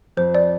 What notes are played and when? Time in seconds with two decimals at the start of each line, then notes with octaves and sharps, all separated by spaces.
0.17 F2 C5
0.35 D5